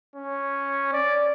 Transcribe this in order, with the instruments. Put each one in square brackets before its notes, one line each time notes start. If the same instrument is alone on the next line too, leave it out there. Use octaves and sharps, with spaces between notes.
[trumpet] C#4
D5